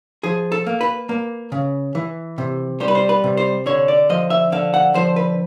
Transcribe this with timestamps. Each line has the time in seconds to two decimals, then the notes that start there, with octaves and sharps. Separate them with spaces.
0.23 F3 G#4
0.52 A4
0.66 A#3
0.81 B4
1.09 A#3
1.52 C#3
1.95 E3
2.38 C3
2.80 G3 C5
2.88 B4
2.95 C5
3.09 B4
3.24 C3
3.37 C5
3.66 D3 C#5
3.88 D5
4.09 F3 D#5
4.30 E5
4.52 D3 F5
4.74 F#5
4.94 F3 C5
5.16 B4